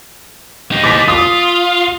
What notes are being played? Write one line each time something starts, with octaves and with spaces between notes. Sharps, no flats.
D#4 G4
D6 A6 B6
F4 D#6